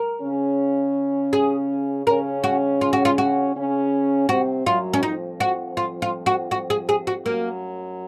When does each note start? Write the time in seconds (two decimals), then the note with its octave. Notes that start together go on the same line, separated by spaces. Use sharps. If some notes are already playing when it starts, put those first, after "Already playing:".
Already playing: A#4
0.21 C#3 C#4
1.33 G#4
2.06 C#3 C#4 A#4
2.44 F#4
2.81 F4
2.93 F#4
3.05 F4
3.18 F#4
3.55 C#3 C#4
4.29 C3 C4 F#4
4.66 F#2 F#3 F4
4.94 C#4
5.03 F2 F3 D#4
5.40 F#4
5.77 F4
6.02 F4
6.26 F#4
6.51 F#4
6.70 G#4
6.89 G#4
7.07 F#4
7.25 F#2 F#3 A#3